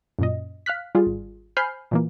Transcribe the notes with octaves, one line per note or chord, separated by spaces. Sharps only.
F#2 A#2 D#5
F5 F6 F#6 B6
G3 F4 G#4
G#1
C5 G#5 B5 F6 G6 C7
A#2 E3 A#3